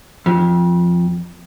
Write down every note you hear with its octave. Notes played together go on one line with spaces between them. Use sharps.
F2